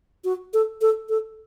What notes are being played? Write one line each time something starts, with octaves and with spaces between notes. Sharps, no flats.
F#4
A4
A4
A4